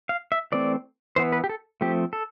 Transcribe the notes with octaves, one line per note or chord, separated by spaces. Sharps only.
F5
E5
E3 A3 C4 D5
E3 B3 C5
B4
G4
A4
F3 A3 C4 G4
A4